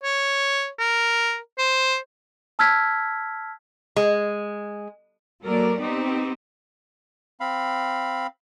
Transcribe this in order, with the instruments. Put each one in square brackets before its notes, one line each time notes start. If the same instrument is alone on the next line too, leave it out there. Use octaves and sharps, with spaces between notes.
[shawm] C#5
A#4
C5
[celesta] A5 E6 F6 G#6 B6
[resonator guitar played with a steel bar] G#3
[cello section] F#3 A#3 A4 A#4 D5
B3 C4 D#4 G4
[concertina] C4 F5 B5